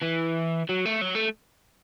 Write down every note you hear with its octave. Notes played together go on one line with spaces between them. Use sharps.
E3
F#3
A3
F#3
A3